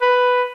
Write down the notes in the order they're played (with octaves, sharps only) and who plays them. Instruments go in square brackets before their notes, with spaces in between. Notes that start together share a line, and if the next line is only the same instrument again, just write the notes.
[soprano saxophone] B4